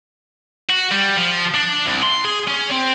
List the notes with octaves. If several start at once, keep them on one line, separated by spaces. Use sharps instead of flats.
F#4
G3
F3
D4
C2
C6
G#4
C#4
C4